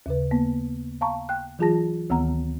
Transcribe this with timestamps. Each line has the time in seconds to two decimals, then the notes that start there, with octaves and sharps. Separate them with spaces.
0.06 D#2 C#3 B4
0.31 A#3 B3
1.01 F5 A5 A#5 C#6
1.29 G5 F#6
1.59 E3 F#3 F4 G#4 A5 A#6
2.10 D2 D#3 B3 F#5 A#5